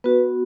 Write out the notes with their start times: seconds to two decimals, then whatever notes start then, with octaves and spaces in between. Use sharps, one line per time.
0.04 B3 F#4 B4